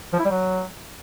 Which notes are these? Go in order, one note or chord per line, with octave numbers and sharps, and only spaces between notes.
F3
E4
G3
F#3